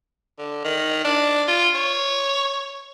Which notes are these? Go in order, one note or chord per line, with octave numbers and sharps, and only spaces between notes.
D3
D#3
D4
F4
C#5